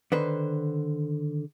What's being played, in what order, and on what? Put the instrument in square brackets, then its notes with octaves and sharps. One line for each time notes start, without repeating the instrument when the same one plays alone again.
[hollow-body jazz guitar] D3 D#3 B4 C5